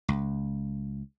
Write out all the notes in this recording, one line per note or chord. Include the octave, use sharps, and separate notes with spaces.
C#2